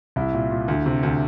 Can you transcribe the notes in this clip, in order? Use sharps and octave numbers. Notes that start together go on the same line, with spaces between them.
C2 E4
A#2
A#2
D2
C3
D2